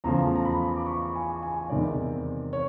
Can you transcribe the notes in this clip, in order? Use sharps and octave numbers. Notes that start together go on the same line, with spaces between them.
E2 C#3 F3 A3 A#5
A#5
B5
D6
C#6
G#5
G#5
E2 C3 D#3 G#3 D5
C#5